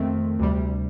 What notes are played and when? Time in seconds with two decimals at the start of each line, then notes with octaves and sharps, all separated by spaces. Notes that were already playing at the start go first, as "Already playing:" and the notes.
Already playing: F2 D#3 A3 C4
0.39 D2 C3 G3